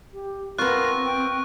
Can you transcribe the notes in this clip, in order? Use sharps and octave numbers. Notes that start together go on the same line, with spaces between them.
G4
B3 C4 F4 A#4 C#6 F#6
G5